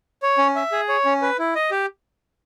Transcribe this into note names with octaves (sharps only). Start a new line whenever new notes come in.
C#5
C#4
E5
G#4
C#5
C#4
B4
E4
D#5
G4